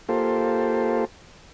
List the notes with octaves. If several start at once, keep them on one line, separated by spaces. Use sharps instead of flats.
A#3 F4 G4 A4 C5